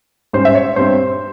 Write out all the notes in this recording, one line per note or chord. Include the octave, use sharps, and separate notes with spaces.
G#2 G3 C#4 C5
E5
C#5
G2 G3 C4 C5